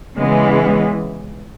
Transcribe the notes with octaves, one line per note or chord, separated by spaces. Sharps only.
C#3 E3 G#3 B3